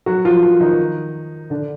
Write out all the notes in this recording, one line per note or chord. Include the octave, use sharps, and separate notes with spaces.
F#3 F#4
F3 F4
F3 F4
D#3 D#4
D3 D4